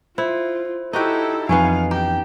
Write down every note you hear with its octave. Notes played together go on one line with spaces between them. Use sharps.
E4 F4 C5
D#4 E4 F#4 G4 A4
F2 E3 B3 C#4 D#4 C#5 F5 G#5
G4 G5 A#5